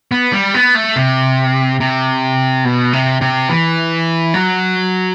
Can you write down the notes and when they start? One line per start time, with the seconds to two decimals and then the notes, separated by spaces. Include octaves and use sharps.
0.11 B3
0.32 G3
0.54 B3
0.75 A3
0.96 C3
1.80 C3
2.65 B2
2.93 C3
3.21 C3
3.49 E3
4.34 F#3